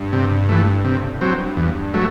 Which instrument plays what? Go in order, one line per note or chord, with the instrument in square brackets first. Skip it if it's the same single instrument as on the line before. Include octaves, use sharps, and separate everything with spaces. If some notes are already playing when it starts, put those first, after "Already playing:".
Already playing: [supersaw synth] G2
[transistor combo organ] C3
E3 A3
[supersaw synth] A2 [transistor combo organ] C3
[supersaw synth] G2 [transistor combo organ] F#3 C4
[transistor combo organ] E2 [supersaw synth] G2
[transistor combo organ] F#3 A3